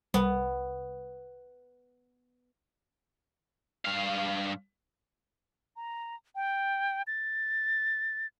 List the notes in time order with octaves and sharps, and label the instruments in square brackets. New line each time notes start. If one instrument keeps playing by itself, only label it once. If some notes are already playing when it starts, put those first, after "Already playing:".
[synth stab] C2 [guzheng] B3
[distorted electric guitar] G2 F5
[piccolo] A#5
G5
A6